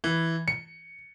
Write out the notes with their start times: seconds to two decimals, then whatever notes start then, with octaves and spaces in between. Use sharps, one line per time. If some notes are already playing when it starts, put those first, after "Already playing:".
0.04 E3
0.48 C#7